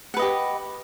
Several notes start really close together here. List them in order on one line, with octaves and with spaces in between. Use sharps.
F#5 B4 D#5 G4